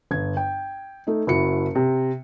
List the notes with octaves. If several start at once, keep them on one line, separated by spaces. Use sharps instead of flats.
G1 G#6
G5
A3 D#4
F#1 E4 F#4 C#7
C3